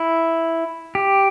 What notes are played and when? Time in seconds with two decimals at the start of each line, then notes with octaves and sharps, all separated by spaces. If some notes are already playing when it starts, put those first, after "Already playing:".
Already playing: E4
0.95 G4